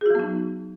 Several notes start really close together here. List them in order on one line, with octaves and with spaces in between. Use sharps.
G#4 F#4 F#3 B3 D#4